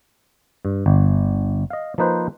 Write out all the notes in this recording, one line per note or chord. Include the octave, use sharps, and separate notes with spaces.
G2
G1
D#5 F5
F3 A#3 D#4 B4 C5